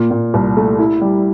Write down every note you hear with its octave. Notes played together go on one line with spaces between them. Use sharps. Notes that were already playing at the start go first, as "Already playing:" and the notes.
Already playing: A#2
A#2
C2
A3
E4
G3